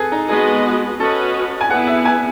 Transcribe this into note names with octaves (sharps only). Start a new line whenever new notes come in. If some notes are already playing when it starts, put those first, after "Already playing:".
Already playing: G#4 A4 B4
D#4
G#3 B3 F#4 G#4 B4 D#5
C#4 F#4 A4 B4 D#5
G#5
B3 E4 G#4 B4 F#5
E5
G#5